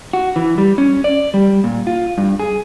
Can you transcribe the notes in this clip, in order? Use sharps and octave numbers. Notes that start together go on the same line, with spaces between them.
F#4
E3
G3
C#4
D5
G3
A#2
F4
G2
G#4